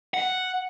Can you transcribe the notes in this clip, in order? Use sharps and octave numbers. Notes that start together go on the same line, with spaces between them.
F#5